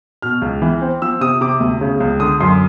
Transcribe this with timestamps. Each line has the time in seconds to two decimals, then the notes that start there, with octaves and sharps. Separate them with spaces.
0.22 B2 F6
0.42 C#2
0.62 E3
0.82 C4
1.02 F3 E6
1.21 C3 D#6
1.41 C3 D6
1.60 D2
1.81 C#3
2.00 C#2
2.20 D3 D#6
2.41 F#2 C6